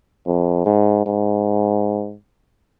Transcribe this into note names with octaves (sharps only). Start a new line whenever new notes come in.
F2
G#2
G#2